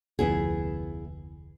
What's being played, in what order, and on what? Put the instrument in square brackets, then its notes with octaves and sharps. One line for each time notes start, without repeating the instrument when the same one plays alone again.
[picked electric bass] F1 D2 F3 [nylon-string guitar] B3 E4 G#4